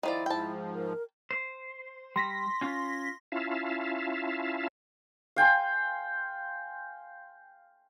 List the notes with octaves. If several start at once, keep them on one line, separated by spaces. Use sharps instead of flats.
D#3 F3 E4 D5
G#2 F3 G5 A5
A#4
C5
G3 C6 A#6 B6
C#4 F4
C#4 E4 F4 E5 F5 A5
F5 G5 G#5 C6